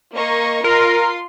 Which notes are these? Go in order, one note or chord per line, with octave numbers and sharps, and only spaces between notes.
A#3 D#5 C#6
F4 A#4 C6